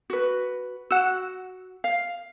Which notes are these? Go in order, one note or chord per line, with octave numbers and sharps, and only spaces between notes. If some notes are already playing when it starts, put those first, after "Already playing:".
F#4 B4
F#4 F#5 E6
F5